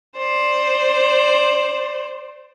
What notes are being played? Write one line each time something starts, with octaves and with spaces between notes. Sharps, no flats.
C5 D5